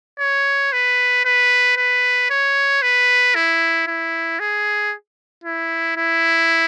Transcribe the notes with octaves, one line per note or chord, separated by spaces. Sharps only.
C#5
B4
B4
B4
C#5
B4
E4
E4
G#4
E4
E4